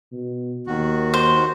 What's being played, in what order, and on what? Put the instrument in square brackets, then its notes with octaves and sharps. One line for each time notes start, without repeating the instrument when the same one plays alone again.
[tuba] B2
[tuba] D#2 [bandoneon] D#3 F#4
[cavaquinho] C5